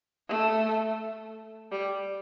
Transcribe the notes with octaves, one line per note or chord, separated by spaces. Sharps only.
A3
G3